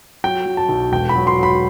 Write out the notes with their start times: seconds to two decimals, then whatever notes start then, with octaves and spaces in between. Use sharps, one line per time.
0.24 F#3 G5
0.46 F#3
0.57 A5
0.69 B1
0.92 E1 G5
1.09 B5
1.16 F#3
1.27 C6
1.38 F#3 B5